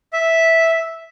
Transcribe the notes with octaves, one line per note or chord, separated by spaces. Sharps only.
E5